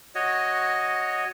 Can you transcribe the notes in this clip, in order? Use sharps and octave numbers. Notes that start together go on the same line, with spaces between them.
F#4 C#5 D#5